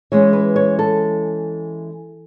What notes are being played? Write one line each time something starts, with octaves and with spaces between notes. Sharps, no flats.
E3 G#3 C#4 C#5
B4
C#5
A4